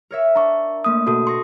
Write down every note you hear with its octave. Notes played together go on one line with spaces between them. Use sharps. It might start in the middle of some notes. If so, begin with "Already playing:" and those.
A#4 C#5 E5
D4 A#5 C#6
A3 A#3 D#6
B2 F#4 A4 D#6
C6 C#6 A#6